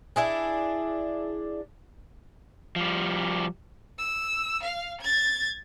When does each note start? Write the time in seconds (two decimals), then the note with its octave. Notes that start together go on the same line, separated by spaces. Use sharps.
0.16 D4 E4 G#4
2.76 F3 G3
3.98 E6
4.63 F5
5.01 G#6 A6